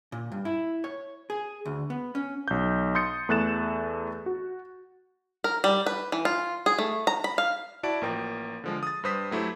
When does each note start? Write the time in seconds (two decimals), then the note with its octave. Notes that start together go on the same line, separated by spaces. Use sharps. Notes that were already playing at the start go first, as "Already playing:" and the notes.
0.12 A#2
0.32 G2
0.45 E4
0.84 C#5
1.30 G#4
1.66 D2
1.90 B3
2.15 C#4
2.48 B1 G6
2.95 C6 D#6 G6 A6 C#7
3.29 E2 A3 F#6 A6 E7
4.26 F#4
5.44 A#4
5.64 G3
5.86 B4
6.12 E3
6.25 F4
6.66 G#4
6.78 A3
7.07 A#5
7.24 B5
7.38 F5
7.83 E4 F#4 D5 A5 D7
8.01 A1 F3 A#3 A#4 G5
8.64 D3 F3 G#3
8.83 D#6 A6
9.04 G2 B4 C5 D#6 B6
9.31 F#3 A3 E4 G4 C5